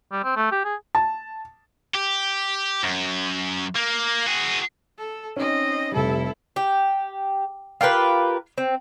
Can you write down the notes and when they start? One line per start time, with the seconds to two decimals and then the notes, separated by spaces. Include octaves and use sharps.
0.12 G3
0.24 C4
0.36 A3
0.51 G4
0.64 G#4
0.95 A5
1.95 G4
2.84 F#2
3.76 A#3
4.26 F#4 G#4
4.98 A4
5.36 C4 C#4 D#4 D#5
5.92 F1 G3 E4 A4
6.56 G4
7.81 F4 G4 A#4 B4
8.58 C4